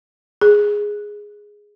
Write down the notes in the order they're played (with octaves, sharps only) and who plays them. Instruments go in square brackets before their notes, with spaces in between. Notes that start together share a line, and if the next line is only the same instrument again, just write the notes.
[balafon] G#4